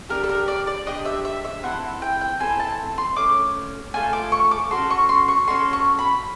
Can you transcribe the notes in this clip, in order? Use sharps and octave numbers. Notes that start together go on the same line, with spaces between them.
D4 G4 A#4
A4
A#4
D5
D5
D4 G4 D#5
E5
E5
E5
C4 E4 A4 F#5
G5
G5
C4 E4 A4 G#5
A5
C6
A3 C#4 D6
A3 C#4 F4 A4 G#5
D6
C#6
D6
C#4 F#4 A4 C6
C#6
C6
C#6
C#4 F#4 A4 C6
C#6
B5